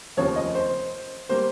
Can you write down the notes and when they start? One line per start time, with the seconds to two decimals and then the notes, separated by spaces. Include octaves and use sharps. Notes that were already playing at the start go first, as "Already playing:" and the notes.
0.17 F1 D#2 C#3 F3 C4 C#5
0.36 D#5
0.55 C5
1.29 G3 A#3 C5